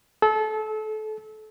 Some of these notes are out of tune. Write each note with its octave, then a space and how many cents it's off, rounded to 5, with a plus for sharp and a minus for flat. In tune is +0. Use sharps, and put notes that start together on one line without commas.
A4 -30